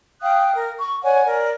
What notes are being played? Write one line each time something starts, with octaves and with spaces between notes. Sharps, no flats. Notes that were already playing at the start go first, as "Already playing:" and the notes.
F5 G5 D#6 F#6
A#4
C#6
C#5 D5 F#5 G#5
A#4 D5